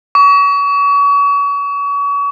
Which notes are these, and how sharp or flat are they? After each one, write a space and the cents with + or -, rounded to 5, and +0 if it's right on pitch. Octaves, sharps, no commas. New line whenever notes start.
C#6 +35